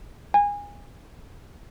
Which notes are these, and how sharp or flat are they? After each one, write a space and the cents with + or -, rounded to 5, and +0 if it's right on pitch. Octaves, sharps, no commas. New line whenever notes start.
G#5 -25